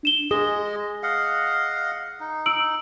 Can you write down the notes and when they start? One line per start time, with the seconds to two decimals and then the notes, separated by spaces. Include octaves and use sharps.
0.03 D4 E7 G7
0.31 G#3 G#4 D#5 D#6
1.03 D#5 F5 F#5
2.20 D#4
2.46 E6 D7 F#7